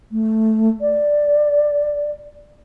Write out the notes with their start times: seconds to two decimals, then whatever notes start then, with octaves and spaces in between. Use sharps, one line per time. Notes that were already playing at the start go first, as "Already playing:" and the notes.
0.12 A3
0.81 D5